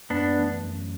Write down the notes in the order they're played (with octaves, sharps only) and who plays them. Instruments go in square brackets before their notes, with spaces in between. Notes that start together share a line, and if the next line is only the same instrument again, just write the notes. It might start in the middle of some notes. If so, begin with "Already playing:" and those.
[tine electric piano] F#2 [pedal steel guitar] B3 D4
[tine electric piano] E3 A3
F#2